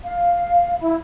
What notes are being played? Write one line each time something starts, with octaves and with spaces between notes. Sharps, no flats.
F5
E4